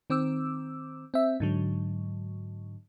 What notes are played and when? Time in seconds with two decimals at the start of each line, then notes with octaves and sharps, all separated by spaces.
0.10 D#3 C4 D6 E6
1.14 C4 E5
1.40 G#2 D3 F#3